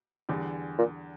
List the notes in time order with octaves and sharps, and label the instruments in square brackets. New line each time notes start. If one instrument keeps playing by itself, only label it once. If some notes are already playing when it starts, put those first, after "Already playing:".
[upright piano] E2 D3 G3
[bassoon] A#2